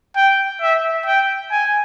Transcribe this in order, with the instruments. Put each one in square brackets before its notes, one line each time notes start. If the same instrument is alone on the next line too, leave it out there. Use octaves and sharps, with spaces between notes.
[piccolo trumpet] G5
E5
G5
G#5